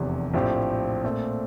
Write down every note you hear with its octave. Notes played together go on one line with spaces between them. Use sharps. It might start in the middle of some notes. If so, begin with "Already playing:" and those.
Already playing: F1 E2 C3
A#1 A2 F3 C4 G4
A#2 A3 C4